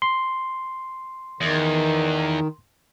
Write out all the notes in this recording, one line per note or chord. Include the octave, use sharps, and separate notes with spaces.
C6
E2 D#3